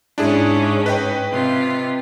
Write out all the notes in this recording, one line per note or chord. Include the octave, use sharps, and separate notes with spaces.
G#2 C#4 D4 E4 G#4
B4 D#5 G5
C3 F4